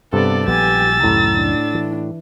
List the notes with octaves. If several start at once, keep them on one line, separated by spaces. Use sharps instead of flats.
G2 C3 B3 A4 D5
A#1 F3 G3 B3 G4 G#5 E6 A6
C#2 F#2 A2 D#3 A#5
D4
E3